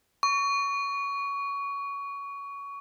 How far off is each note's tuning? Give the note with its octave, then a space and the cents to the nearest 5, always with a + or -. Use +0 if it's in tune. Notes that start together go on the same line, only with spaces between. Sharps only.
C#6 +20